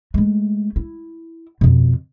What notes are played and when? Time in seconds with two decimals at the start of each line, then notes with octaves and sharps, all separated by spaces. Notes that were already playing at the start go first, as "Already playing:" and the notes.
0.14 G#3 A3
0.76 E4
1.61 F2 B2